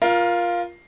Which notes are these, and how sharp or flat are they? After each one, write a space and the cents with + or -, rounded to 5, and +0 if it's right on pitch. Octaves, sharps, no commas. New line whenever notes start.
F4 +0 A#4 +20